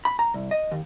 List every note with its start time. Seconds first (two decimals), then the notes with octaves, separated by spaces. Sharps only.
0.05 B5
0.19 A#5
0.34 C2
0.51 D#5
0.72 D#2